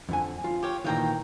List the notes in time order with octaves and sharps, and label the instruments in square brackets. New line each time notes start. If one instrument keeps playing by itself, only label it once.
[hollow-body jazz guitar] F2 D3 G#5
F4
[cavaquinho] G4 C#5 F5
[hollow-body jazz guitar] A#2 D#3 E3 [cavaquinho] F5 G5 A#5